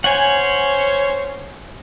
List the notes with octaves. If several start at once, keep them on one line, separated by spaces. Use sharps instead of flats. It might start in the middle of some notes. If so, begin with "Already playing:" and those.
C#4 C5 C#5 F#5 G#5